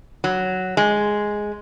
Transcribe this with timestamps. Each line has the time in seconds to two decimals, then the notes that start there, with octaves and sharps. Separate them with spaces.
0.24 F#3
0.77 G#3